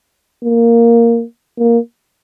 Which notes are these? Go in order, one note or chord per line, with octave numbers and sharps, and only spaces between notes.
A#3
A#3